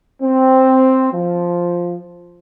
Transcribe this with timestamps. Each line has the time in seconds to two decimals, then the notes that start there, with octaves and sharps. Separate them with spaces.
0.22 C4
1.12 F3